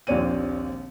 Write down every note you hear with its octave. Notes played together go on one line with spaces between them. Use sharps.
A#1 D#2 C4 C#5 D5 D#7